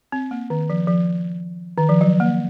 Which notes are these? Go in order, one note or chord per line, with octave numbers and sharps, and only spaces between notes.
C4
A#3
D#3
F3
F3
D#3
F3
F#3
A#3